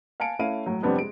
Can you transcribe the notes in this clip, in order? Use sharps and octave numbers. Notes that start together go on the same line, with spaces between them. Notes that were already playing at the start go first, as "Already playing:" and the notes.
F5 G#5 A5 C#7 D7
A3 C#4 E4 F5 D7 D#7
A2 F#3
F2 C3 G3 B3 C4 D4
G#3 D7